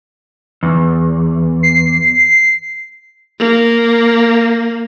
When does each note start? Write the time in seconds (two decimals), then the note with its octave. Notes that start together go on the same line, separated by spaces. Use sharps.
0.63 E2
1.63 C7
3.40 A#3